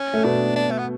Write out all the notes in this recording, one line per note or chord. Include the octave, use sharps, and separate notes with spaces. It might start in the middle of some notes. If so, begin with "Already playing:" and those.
Already playing: C#4
A3
B2 B3 D4
D4
A3
B3